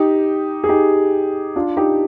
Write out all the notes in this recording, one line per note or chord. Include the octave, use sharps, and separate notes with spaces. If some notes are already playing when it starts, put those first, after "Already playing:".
Already playing: D#4 G4
G#4
D#4 G4
D4 F4
D#4 G4